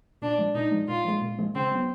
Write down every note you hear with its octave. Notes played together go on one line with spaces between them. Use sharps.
A#2 D4
F3 G#3
A#2 D#4
F3 G#3
A#2 F4
F3 G#3
A#2
F3 G#3
C#3 C4
F#3 B3